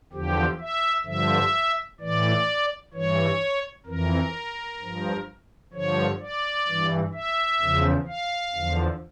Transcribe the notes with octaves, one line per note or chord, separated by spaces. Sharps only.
E2 D3 F3 G4
E5
G2 D3 F3 E5
A2 E3 D5
G2 E3 C#5
F2 E3 A#4
G2 F3
G2 D3 F3 C#5
D5
G2 E3
E5
E2 C#3 F3
F5
E2 D3 F3